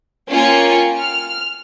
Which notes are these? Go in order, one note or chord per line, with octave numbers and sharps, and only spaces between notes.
A#3 C#4 F4 G5 G#5 C#7
F6